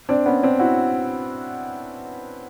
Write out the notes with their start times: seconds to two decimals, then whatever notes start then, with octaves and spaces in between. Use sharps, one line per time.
0.09 C4 D4
0.26 B3 C#4
0.43 C4 D4
0.59 E4 F#4